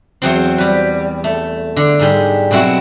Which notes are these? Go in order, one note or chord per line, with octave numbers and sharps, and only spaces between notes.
E2 F#3 C4
G3 B4
A3
D3
G#2 G3
B2 F#3 C4 E4 F#4